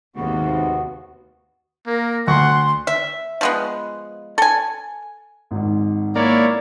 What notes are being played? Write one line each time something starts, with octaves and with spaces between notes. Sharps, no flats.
D#2 G#2 C3 B3 F#4
A#3 A#4
D2 F#5 C6 C#6
E5
F3 G#3 B3
A4 G#5
G#1 G#2
A#3 E4 C#5 D5